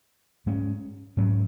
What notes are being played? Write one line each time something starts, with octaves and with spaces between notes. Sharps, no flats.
G#2 G#3 C#4
G#2 F#3 C#4